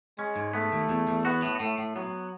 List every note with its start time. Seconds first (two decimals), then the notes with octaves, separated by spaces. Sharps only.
0.18 G#3 C#4
0.36 G#2
0.53 A3 B3
0.72 D#2
0.89 E2
1.08 E2
1.25 B3 F#4
1.42 A2
1.60 A2 A3
1.78 A2
1.96 F#3 B3